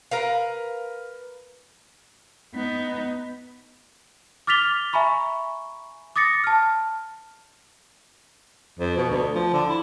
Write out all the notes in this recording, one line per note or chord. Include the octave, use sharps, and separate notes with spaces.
A#4 B4 F5
B3 D#4
D6 F6 A6 B6 F7 G7
E5 G#5 A#5 B5 C#6
D6 D#6 A6 A#6 C#7
A5 F6
F2
B2
D2
F3
D3
E4